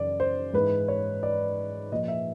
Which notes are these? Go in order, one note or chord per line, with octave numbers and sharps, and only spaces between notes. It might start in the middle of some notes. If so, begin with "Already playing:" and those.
Already playing: F#2 C#3 E3 D5
C5
G#2 E3 B4
C#5
D5
A#2 F3 D#5
E5